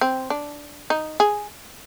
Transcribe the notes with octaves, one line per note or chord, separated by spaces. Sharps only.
C4
D4
D#4
G#4